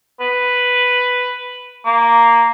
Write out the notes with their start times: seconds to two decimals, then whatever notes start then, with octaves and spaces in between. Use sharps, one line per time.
0.20 B4
1.86 A#3